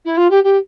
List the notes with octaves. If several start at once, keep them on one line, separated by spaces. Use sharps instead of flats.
E4
F4
G4
G4